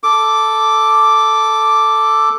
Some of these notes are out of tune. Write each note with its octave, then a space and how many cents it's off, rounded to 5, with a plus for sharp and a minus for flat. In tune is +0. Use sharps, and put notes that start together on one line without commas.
A4 +0 D6 +0